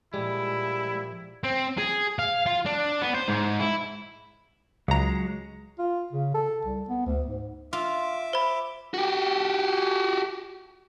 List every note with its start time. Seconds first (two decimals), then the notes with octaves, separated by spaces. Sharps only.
0.14 A#2 F3 G3 G#3 E4
1.44 C4
1.78 G#4
2.19 F5
2.46 F4
2.66 D4
3.01 B3
3.14 C5
3.28 G#2
3.60 E4
4.88 C#2 F#3 G#3 A#5
5.79 F4
6.13 C#3
6.34 A4
6.65 C2
6.89 B3
7.06 D2
7.26 G#2
7.73 F4 E5 D6
8.33 C5 B5
8.94 F#4 G4